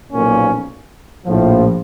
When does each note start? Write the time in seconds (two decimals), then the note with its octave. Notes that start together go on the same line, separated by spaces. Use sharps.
0.11 B1 A#2 F3 A#3 C#4
1.25 A#1 A2 F3